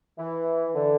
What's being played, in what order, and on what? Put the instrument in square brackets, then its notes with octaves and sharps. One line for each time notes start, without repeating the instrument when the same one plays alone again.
[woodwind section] E3
D3